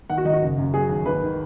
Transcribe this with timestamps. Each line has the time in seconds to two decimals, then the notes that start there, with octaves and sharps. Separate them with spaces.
0.09 D#3 F#5
0.18 F#4
0.25 G#1 D#4
0.33 F#4
0.42 F#1
0.58 F#2
0.73 F#3 G#4
0.89 D#2
1.06 G#1 B4
1.22 D#3